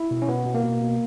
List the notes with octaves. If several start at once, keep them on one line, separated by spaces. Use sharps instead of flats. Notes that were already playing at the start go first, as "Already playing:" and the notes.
Already playing: E4
B2
C#4
B2 B3
B2
A#3
B2
B2